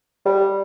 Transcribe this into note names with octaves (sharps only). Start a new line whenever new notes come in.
G3